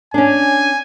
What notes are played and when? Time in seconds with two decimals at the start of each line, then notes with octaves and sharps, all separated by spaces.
0.14 C#4 D4 G#5